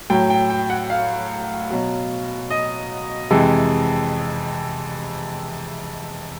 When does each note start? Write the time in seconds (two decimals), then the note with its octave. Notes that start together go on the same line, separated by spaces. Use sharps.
0.10 A2 F#3 G5
0.30 G5
0.50 G5
0.70 F#5
0.90 F5
1.71 B2 F#3
2.50 D#5
3.31 F2 C3 E3 G#3